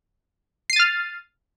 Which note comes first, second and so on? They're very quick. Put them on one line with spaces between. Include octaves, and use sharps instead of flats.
C7 D#7 A6 F6